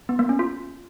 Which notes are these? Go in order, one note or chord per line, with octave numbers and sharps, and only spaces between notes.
B3
A#3
C#4
F4